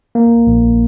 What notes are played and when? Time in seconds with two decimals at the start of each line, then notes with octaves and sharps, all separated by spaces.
0.15 A#3
0.47 A#1